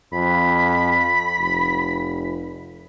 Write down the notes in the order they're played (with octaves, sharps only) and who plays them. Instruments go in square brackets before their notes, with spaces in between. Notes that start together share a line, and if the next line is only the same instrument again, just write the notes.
[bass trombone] F2 [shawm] B5
[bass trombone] F1